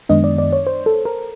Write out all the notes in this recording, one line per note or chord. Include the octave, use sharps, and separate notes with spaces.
F#2 D#3 G#3 B3 D4 D#5
D5
D5
C#5
C5
A4
A#4